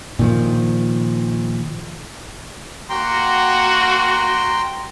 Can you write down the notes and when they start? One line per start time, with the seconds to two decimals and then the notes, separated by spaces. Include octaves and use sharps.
0.19 A#2 D#3 F3
2.90 A#3 F#4 G5 A#5 C6